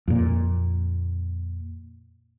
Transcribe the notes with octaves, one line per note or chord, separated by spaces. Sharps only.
F2 A#2